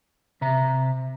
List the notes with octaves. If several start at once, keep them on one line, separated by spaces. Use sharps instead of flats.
C3 E5 A#5